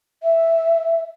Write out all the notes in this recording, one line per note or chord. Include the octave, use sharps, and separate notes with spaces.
E5